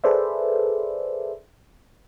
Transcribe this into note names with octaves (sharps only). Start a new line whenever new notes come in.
G#4 A4 B4 C5 D5 E5